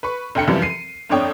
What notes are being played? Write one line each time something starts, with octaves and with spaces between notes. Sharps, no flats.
B4 B5 C#6
F1 D2 G5 C#7
F#2 C3 E3 F3 G3
C7 D#7
G1 F2 D4 C#5 G5 D#6